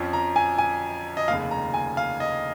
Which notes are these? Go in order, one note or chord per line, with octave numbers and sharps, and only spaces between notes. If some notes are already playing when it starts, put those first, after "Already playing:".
Already playing: F2 F3 C#4
A#5
G#5
G#5
D#5
F1 D#2 C#3 F5
A#5
G#5
F5
D#5